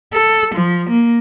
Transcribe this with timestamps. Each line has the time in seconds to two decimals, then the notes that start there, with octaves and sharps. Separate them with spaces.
0.13 A4
0.55 F3
0.90 A#3